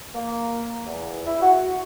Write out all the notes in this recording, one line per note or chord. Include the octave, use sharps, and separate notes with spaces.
A#3
E2
E4
F#4